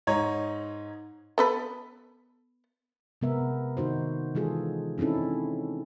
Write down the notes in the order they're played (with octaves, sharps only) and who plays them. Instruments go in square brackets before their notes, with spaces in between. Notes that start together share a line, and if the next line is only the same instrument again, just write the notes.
[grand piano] G#2 D#4 C#5 A#5
[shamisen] B3 A4 B4
[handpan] C3 G#3 B3 A#4 E5
D#3 D#4 F#4 C5
E3 G#3 F4 G#4 A4
C4 C#4 D#4 E4 A4